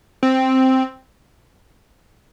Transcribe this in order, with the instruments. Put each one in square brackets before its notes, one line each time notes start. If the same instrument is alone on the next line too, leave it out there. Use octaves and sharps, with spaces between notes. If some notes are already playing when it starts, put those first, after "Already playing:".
[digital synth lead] C4